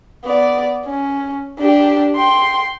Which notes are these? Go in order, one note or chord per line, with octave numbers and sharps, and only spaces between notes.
B3 D5
C#4
D4 G4
G5 C6